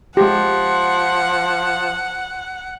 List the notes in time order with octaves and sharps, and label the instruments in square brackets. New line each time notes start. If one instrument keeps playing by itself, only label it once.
[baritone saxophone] F3 [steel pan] G#3 G4 [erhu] F#5